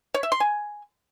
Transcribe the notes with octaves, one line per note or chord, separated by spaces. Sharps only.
C#5
E5
C6
G#5